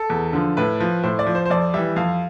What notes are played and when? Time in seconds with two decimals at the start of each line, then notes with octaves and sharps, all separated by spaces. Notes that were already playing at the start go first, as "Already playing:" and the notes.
Already playing: A4
0.10 E2
0.33 D3 F3
0.57 A2 B4
0.80 F3
1.03 A2 C5
1.19 D5
1.26 F3
1.35 C5
1.45 C5
1.50 F2 D5
1.74 E3 G3 E5
1.96 F2 F5